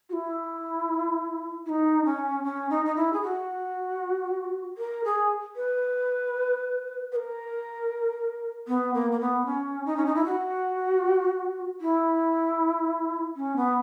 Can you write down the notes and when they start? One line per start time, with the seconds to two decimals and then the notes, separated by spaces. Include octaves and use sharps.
0.09 F#4
0.13 E4
1.66 E4
1.69 D#4
2.05 C#4
2.44 C#4
2.70 D#4
2.85 D#4
2.96 E4
3.13 G#4
3.22 F#4
4.78 A#4
5.04 G#4
5.56 B4
7.12 B4
7.16 A#4
8.68 B3
8.94 A#3
9.12 A#3
9.20 B3
9.46 C#4
9.86 D#4
9.97 C#4
10.06 D#4
10.15 E4
10.25 F#4
11.81 E4
13.36 C#4
13.56 B3